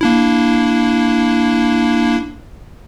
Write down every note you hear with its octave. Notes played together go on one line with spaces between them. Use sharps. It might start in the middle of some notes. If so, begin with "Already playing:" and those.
A#3 D4 E4